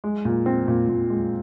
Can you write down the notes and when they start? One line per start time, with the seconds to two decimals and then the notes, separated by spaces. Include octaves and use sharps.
0.04 G#3
0.25 A#2
0.46 C4
0.68 A#2
0.89 A#2
1.10 G#3